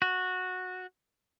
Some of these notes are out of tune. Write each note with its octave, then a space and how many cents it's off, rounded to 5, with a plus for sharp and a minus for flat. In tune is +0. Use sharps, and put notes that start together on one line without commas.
F#4 -10